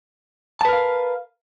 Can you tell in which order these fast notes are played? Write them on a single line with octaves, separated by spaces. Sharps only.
A5 B4 A#4 F5